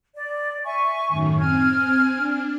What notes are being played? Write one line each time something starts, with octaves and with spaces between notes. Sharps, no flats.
D5
E5 G#5 C#6
F#2 A2 D#3
C4 G#5 F6 G#6
D4